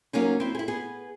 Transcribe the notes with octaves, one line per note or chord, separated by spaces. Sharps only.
F#3 A#3 C#4 D#4
C4 E4
E4 G#4
B3 G#4